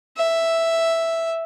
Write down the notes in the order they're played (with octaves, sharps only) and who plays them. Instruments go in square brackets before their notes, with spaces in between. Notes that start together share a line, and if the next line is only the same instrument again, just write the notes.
[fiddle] E5